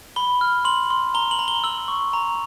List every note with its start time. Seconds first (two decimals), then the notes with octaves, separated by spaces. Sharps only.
0.16 B5 G7
0.41 F6
0.65 C6 F#7
0.90 C6
1.14 A#5 G7
1.31 F#7
1.39 A#5
1.48 G7
1.64 E6 F#7
1.88 C#6
2.13 A#5